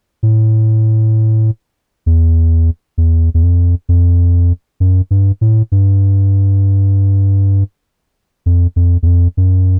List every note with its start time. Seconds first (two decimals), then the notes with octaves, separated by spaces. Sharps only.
0.23 A2
2.06 E2
2.98 E2
3.34 E2
3.43 F2
3.89 F2
4.80 F#2
5.11 G2
5.41 A2
5.72 G2
8.46 F2
8.76 F2
9.03 E2
9.07 F2
9.37 F#2